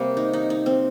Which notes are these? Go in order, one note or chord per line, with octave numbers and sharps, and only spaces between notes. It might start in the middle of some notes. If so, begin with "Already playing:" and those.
Already playing: C3 G3 A#3
D#4
D#4
D#4
C4